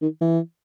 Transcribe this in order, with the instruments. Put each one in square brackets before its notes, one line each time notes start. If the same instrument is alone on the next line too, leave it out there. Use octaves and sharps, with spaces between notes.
[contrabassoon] D#3
E3